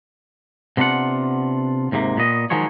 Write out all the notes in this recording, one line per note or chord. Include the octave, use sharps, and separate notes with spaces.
C3 B3 D4 F4 F#5
D#2 G#2 C3 A#3
A#2 B3 D#5
D#3 F3 F#3 G#3 C#5